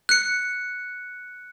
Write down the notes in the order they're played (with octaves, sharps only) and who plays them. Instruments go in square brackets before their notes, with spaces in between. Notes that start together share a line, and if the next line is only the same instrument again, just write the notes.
[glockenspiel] F#6 C#7